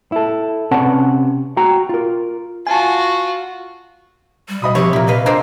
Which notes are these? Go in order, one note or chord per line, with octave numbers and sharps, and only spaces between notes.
E4 A4
C3 C#4 B4 D5 F#5 A5
F#4 G5 A#5
F4 A#4
F4 F#4 G#5 A5
G3
B2 D#5 B5 D#6
C3 F3 G4 C#5
A#2 A#3 E4
B4 D#5 F5
G#3 A#3 C4 D4 C5